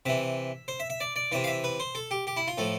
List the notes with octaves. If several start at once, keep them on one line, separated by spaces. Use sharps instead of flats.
C3 E3 E5
C5
E5
E5
D5
D5
C3 E3 E5
F5
E5
B4
C5
A4
G4
G4
E4
F4
A2 F3 A4